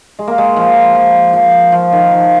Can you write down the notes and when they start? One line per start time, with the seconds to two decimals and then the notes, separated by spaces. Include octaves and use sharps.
0.19 G#3
0.27 A#3
0.38 G#3
0.56 F3
0.95 F3
1.33 F3
1.72 F3
1.92 D#3
2.11 F3